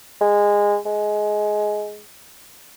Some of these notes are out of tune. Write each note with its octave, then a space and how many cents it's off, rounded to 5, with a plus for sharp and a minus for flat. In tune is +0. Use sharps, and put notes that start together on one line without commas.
G#3 -20
G#3 +15